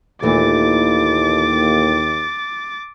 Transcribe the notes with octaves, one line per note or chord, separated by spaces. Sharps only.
D#2 A#2 E3 A3 D6 A6